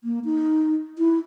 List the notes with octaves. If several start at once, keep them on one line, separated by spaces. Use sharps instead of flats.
A#3
D#4
E4